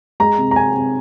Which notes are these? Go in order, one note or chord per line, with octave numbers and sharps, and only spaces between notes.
G#3 A#5
C3
A#5
C3 G#5
C3